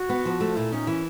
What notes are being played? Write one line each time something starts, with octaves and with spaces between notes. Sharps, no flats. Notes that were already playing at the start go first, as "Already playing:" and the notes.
Already playing: F#4
B3
F3
A3
A#2 E4
C#4 D#4
E3 E4